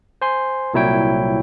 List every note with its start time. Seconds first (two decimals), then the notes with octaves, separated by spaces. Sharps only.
0.22 C5 G#5 C6
0.74 C2 A#2 F#3 E4 C#5 G5